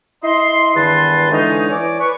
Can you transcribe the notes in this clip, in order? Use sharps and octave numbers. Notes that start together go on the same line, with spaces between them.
E4 D#5 C6
E2 G2 D#3 B4 A5 C6
D3 E3 G#3 C#4 D#4
E3 C#5 D5 G#5 D6
B4 C#6